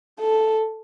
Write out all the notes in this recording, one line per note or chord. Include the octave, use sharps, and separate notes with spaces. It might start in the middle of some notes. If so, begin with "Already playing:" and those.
A4